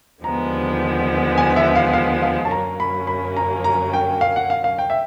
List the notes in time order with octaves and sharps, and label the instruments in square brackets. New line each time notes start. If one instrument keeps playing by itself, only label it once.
[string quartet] D#2 D3 F3 G#3 B3 [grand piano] A#5
[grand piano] G#5
E5
F5
F5
F5
A5
[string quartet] F#2 D3 F#3 A#3 C#4 [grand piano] A#5
[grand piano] B5
B5
A#5
A#5
G5
F5
F#5
F5
F5
G5
E5